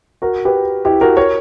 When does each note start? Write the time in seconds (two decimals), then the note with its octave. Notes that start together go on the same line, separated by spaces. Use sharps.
0.22 F#4 A#4
0.45 G4 B4
0.85 E4 G4
1.01 F#4 A#4
1.17 A#4 C#5